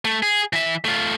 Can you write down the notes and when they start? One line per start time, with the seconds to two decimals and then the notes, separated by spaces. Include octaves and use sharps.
0.05 A3
0.23 G#4
0.53 E3 E5
0.85 A3 F4